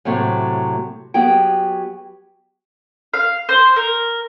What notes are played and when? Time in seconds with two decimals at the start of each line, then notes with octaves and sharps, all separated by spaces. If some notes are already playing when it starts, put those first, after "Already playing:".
0.05 A2 C3 F#3 A3
1.14 F#3 B3 G4 G#4 G5
3.14 F5
3.49 C5
3.76 A#4